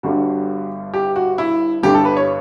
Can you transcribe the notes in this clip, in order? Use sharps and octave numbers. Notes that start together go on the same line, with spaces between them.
G1 G2 D3 G3 F#4
G4
F#4
E4
G1 G2 D3 G4
A4
B4
C#5